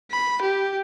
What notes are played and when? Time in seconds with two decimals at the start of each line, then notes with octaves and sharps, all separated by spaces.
0.11 B5
0.42 G4